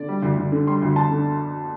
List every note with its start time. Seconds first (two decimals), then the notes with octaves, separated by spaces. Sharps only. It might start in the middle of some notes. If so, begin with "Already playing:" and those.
Already playing: D3 D5
0.08 G3
0.23 D2
0.37 D2
0.52 D3
0.67 G3 C6
0.82 D2
0.96 D2 A5
1.11 D3